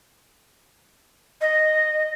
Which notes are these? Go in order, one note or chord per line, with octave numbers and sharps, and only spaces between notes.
D#5